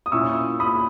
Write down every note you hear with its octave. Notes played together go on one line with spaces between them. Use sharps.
D#6
A#2 A#3 C#4 E4 C#6 E6
B5 D#6